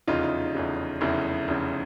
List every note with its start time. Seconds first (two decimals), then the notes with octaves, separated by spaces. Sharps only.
0.07 F1 E2 C#3 D#4 F4
0.54 F1 E2 C#3
1.01 F1 E2 C#3 E4
1.48 F1 E2 C#3